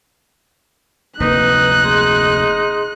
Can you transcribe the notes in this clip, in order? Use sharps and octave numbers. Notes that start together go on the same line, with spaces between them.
F1 D2 A#3 D#4 B4 F#6
G#4 D#5 C6